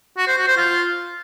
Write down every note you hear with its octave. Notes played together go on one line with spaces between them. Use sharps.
F#4
C5
F#4
C5
F4